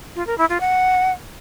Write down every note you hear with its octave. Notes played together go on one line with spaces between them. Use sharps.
F4
A#4
E4
F4
F#5